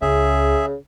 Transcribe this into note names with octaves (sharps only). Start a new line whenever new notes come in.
C#2 C#3 G#4 E5